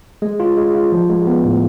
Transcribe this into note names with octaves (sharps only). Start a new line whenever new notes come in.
G#3
F4
G#3
F4
F3
G#3
B3
A2